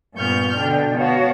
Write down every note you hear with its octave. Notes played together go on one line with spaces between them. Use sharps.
G2 A#2 B3 C#6 F6 G6
B2 D3 D4 G5
B3 F#4 C#5 F5 A5